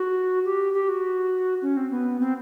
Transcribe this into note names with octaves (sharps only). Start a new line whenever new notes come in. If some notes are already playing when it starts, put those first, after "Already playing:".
Already playing: F#4
G4
G4
F#4
C#4
C4
B3
C4